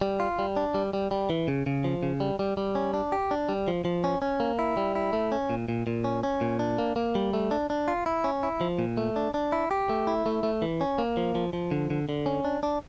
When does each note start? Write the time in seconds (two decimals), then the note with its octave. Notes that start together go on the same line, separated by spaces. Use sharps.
0.01 G3
0.20 F4
0.39 G3
0.56 D4
0.74 G3
0.93 G3
1.11 G3
1.30 E3
1.48 C#3
1.66 C#3
1.84 F3
2.03 C#3
2.20 G3
2.39 G3
2.57 G3
2.75 C#4
2.94 D4
3.12 G4
3.31 D4
3.49 G3
3.68 F3
3.85 F3
4.04 C#4
4.22 C#4
4.40 A#3
4.59 E4
4.77 G3
4.95 E4
5.13 A3
5.32 C#4
5.50 A#2
5.68 A#2
5.87 A#2
6.04 C#4
6.23 C#4
6.41 A#2
6.59 D4
6.78 A#3
6.96 A#3
7.15 G3
7.33 A3
7.51 D4
7.70 D4
7.88 F4
8.06 E4
8.24 C#4
8.43 E4
8.61 F3
8.79 A#2
8.97 A3
9.16 D4
9.34 D4
9.52 E4
9.71 G4
9.89 A3
10.07 E4
10.26 A3
10.43 A3
10.62 E3
10.81 C#4
10.98 A#3
11.17 F3
11.35 F3
11.53 F3
11.71 D3
11.90 D3
12.09 D3
12.26 C#4
12.45 D4
12.63 D4